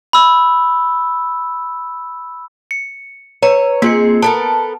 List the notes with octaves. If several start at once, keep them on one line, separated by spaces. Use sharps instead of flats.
B5 E6
C#7
B4 C#5 A#5
A#3 C4 F4 G#4 C#7
B3 A4 A#4 A5